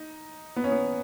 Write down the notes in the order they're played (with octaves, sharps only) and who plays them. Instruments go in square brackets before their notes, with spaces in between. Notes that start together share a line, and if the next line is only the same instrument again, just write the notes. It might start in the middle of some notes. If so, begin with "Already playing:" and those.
Already playing: [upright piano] D#4
B3
C#4
B3